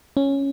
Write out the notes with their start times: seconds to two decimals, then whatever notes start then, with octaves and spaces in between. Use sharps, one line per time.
0.17 C#4